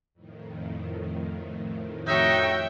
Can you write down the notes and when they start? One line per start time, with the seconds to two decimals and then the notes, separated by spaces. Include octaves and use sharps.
0.14 F2 A2 D#3
2.07 D#4 F#4 C#5 E5 G5